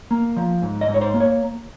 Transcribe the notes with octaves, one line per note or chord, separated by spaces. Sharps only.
A#3
F3
G#2
D#5
G#2
C#5
C5
A#3
C#5